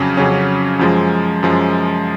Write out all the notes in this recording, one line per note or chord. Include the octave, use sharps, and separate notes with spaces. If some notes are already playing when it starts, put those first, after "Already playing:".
Already playing: F2 C#3 F#3 C#4
F2 C#3 F#3 C#4
F#2 F3 G#3
F#2 F3 G#3